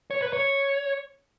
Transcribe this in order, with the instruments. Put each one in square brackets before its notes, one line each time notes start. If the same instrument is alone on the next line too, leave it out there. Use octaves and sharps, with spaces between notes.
[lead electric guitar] C#5
B4
C#5